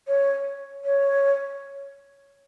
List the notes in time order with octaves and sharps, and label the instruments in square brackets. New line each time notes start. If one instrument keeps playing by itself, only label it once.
[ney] C#5
C#5